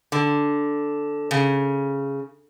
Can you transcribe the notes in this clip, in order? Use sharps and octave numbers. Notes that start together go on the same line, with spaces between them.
D3
C#3